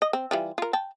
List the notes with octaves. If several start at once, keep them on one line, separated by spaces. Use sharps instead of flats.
D#5
C4
E3 G3 F4
F4 A#4
G5 A5